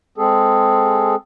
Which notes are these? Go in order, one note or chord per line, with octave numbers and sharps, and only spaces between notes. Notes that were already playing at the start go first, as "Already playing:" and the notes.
G#3 C4 G#4 A4